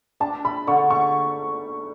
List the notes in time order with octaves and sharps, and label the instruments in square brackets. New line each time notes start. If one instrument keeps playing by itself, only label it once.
[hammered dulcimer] D4 [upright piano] A5
[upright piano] B5
[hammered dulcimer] D3 [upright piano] C#6
[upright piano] C#6